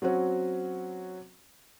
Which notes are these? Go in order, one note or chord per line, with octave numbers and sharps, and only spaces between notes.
F#3 C4 C#4 F#4